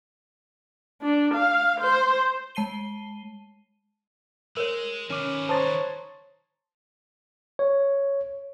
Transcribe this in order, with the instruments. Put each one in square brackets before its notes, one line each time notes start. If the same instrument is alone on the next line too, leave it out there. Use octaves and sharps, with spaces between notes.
[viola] D4
F5
C5
[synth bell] G#3 A5 C7 D#7 G7
[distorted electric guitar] G#3 [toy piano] A#4 C#5
[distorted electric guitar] D#3 B4 [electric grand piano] C#4 D6
[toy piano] C5 A5 D#6 [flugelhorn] C#5 [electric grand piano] A#5 C6 A6
[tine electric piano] C#5